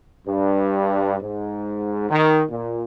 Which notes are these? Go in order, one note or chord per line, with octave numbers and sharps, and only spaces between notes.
G2
G#2
D#3
A#2